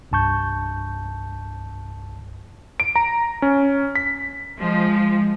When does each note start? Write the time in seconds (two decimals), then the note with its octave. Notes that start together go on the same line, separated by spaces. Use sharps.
0.12 C2 G2 A5 C#6 G6
2.80 D7
2.96 A#5
3.42 C#4
3.95 B6
4.59 F3 G#3